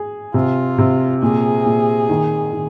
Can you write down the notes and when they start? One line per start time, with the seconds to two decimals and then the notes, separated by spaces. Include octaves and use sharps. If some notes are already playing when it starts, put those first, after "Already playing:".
Already playing: G#4
0.34 C3 F4
0.78 C3
1.22 A#2 G#4
1.65 A#2
2.09 D#3
2.53 D#3